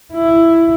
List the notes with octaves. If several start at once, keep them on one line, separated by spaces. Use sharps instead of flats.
E4